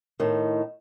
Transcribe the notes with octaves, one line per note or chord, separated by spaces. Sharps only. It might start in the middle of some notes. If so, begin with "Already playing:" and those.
A2 D#3